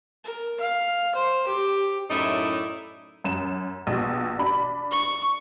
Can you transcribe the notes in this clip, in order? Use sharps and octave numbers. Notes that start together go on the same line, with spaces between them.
A#4
F5
C5
G4
F#2 A2 D#4 E4 D5 E5
F#2 E7
A#1 B2
D4 B5
C#6